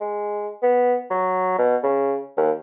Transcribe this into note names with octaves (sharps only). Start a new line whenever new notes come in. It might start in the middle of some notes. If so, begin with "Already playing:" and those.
G#3
B3
F#3
B2
C#3
D#2